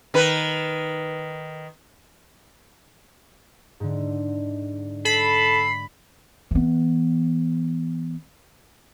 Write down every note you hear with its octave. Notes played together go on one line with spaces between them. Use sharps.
D#3 B4
G#2 D3
A4 B5 C7
E3 B3